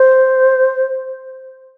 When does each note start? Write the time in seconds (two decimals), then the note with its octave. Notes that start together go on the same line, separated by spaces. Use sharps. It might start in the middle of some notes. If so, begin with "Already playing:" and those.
Already playing: C5